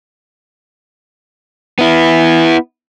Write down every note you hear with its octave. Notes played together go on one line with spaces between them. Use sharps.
B3 E4